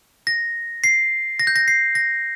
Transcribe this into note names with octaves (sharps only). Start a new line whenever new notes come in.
A#6
C7
A#6
G6
A#6
C7
A#6